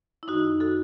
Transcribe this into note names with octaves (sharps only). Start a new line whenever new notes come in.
E4
F#2 D#3 D#4 F#4
F#4 A4